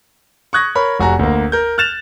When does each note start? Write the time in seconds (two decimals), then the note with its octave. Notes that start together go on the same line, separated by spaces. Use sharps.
0.53 C#6 D#6 F#6 G#6 A#6
0.75 A#4 C#5 B5
1.00 F1 F#4 G#5 A#5
1.19 D2 A#3
1.52 A#4 G6
1.78 F6 F#6 A6 E7 F7